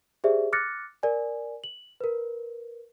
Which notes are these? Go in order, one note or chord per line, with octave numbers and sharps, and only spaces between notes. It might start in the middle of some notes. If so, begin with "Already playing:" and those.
G4 G#4 C5 D5 E5
D6 F6 F#6 A6 A#6 C#7
A#4 D5 G#5
F#7
A#4 B4